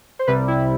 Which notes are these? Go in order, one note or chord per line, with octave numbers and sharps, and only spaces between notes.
C5
C2 C3 G3 B4
E4